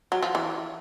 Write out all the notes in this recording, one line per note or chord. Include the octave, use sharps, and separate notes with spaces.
F#3
F3
E3